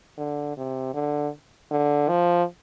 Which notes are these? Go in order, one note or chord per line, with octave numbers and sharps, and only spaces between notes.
D3
C3
D3
D3
F3